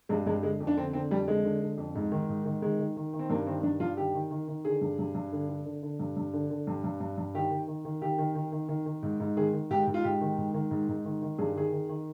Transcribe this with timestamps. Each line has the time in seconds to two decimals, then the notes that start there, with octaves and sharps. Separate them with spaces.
0.09 G2 G#3
0.26 G2 G#3
0.43 D3 G#3
0.60 F2
0.67 D4
0.77 D3 C4
0.93 D3 C4
1.10 F2 G3
1.28 D3 G#3
1.45 D3
1.62 D3
1.78 F2
1.95 G#2
2.12 D#3
2.29 G#2
2.46 D#3
2.62 D#3 G#3
2.79 D#3
2.97 D#3
3.13 D#3
3.19 C4
3.30 G2 A#3
3.47 D#3 C4
3.63 G2 D4
3.80 G2 F4
3.97 D#3 G4
4.14 D#3
4.31 D#3
4.48 D#3
4.65 D3 G#4
4.81 G2
4.99 G2
5.15 G2
5.32 D3
5.49 D3
5.66 D3
5.83 D3
6.00 G2
6.17 G2
6.33 D3
6.50 D3
6.67 G2
6.84 G2
7.00 G2
7.18 G2
7.34 D#3 G4
7.51 D#3
7.68 D#3
7.85 D#3
8.02 D#3 G4
8.18 D#3
8.35 D#3
8.52 D#3
8.69 D#3
8.86 D#3
9.03 G#2
9.20 G#2
9.37 D#3 G#4
9.54 D#3
9.70 G#2 G4
9.87 G#2
9.94 F4
10.04 G#2 G4
10.21 D#3
10.38 G#2
10.54 D#3
10.71 G#2
10.89 G#2
11.05 D#3
11.22 D#3
11.38 G2 G#4
11.56 D#3 G#4
11.72 D#3
11.89 D#3